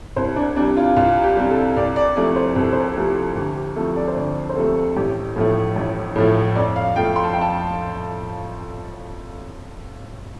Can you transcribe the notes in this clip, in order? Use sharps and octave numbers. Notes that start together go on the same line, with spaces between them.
C2 C5
D4
C3 G3 D4
F4
C2 F4
G4
C3 G3
A4
C2 D5
D5
C3 F3 A3 D5
C5
C2 A4
C5
A4
C3 F3 A3 G4
D2 G4
G4
C3 F3 A3 A4
D5
C5
D2 D5
C5
C3 F3 A3 A4
A1 G4
A2 F3 A3
A1
A2 F3 A3
F2 D5
F5
F3 A3 G5
C6
A5
F2 G5
A5